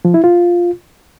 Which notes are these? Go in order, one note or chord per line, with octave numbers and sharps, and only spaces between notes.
F3
E4
F4